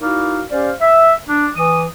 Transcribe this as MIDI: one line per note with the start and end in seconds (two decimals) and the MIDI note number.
0.01 0.42 63
0.01 0.42 64
0.01 0.42 66
0.01 0.42 70
0.01 0.42 74
0.01 0.42 77
0.51 0.71 61
0.51 0.71 67
0.51 0.71 72
0.51 0.71 74
0.51 0.71 77
0.81 1.13 76
1.28 1.48 62
1.56 1.84 52
1.56 1.84 87